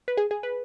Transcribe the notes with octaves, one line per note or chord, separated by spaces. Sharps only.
B4
G#4
G#4
B4